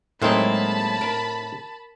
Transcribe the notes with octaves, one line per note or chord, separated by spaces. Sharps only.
A2 F#3 G#3 A#3 C4 D#4 A5 B5
A#4